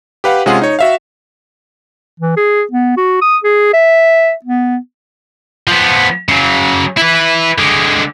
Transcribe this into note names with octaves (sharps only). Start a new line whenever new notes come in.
G4 B4 F5 F#5
C3 G#3 C#4 F4 G#4 F#5
D#4 C#5
F#4 E5 F5
E3
G#4
B3
F#4
D#6
G#4
E5
B3
F3 B3
C#3 F#3
E4 B4
D3 G#3